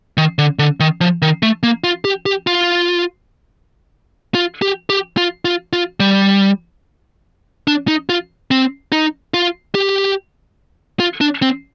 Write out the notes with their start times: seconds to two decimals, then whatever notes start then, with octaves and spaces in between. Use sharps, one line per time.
0.18 D#3
0.38 D3
0.59 D3
0.80 D#3
1.01 F3
1.22 D#3
1.43 A3
1.63 A#3
1.84 F4
2.05 G4
2.26 G4
2.47 F4
4.35 F4
4.62 G4
4.90 G4
5.17 F4
5.45 F4
5.73 F4
6.00 G3
7.67 D4
7.88 D#4
8.09 F4
8.51 C4
8.92 D#4
9.34 F4
9.75 G4
11.00 F4
11.21 D4
11.42 C4